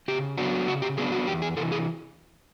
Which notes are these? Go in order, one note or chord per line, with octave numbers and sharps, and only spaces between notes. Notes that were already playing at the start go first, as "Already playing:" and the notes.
C#3 G4
F#3 B3 D4 F#4
C#3 F#4
G4
F#3 B3 D4 G#4
F#4
E2 G4
G#4
C3 E3 A4
G#4